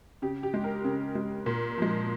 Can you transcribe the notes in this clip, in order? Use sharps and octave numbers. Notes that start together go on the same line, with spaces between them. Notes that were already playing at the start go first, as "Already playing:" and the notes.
C#3 G4
G4
G#3
A#4
C#3
G#3
A#2
F3 G#3